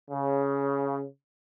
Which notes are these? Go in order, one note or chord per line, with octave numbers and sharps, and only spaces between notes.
C#3